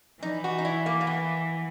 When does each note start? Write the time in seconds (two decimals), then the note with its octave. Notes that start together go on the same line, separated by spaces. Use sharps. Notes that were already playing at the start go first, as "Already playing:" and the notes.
0.22 E3 D#4
0.44 F#4
0.58 D#4
0.65 E4
0.86 A#3
1.01 A#3
1.07 B3